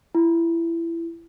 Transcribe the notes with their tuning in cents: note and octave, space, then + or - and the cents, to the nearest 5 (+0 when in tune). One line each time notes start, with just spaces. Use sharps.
E4 +20